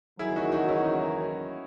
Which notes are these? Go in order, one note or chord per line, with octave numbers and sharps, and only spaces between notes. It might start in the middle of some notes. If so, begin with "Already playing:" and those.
F#1 E2 D#3 F#3 E4 G#4
D#4 F#4
D#4 F#4
C#4 E4
D#4